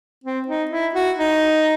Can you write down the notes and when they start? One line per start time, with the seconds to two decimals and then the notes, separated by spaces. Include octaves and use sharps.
0.24 C4
0.48 D#4
0.71 E4
0.95 F#4
1.18 D#4